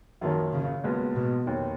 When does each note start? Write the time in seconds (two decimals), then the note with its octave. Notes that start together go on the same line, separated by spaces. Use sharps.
0.21 F#2 D#3 F3 A#3 C#4
0.53 C#3
0.84 B1 A#2 G#3 B3
1.15 B2
1.46 F1 D#2 D#3